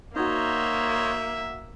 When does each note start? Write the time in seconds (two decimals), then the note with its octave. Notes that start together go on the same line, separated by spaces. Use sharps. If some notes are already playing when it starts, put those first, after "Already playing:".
0.16 A#3 D#4 F#4 C5 C#5 D#5 E5